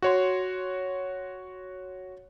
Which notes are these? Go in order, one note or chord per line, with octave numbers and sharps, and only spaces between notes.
F#4 C#5 C6